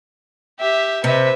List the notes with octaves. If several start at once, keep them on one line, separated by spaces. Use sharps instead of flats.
G4 E5
C3 B4 E5